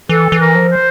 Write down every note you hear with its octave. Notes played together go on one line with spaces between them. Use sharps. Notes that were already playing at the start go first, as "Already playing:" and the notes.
E3 A4
E3
A#4
F3
C5